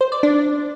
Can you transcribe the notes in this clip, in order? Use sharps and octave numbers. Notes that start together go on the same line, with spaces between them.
C5
D5
D4